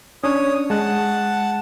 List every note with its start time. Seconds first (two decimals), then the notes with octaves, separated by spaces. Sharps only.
0.24 C#4 D4 C#5 D#6
0.70 G#3 F#5 A5